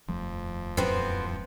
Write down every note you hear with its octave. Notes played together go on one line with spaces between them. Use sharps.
D#1 F2 F3 A3
F#2 A2 C3 B3 C4